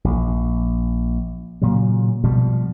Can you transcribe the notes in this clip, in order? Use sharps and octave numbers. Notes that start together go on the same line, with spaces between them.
A#1
A#2 C#3 F#3
B2 F3 G3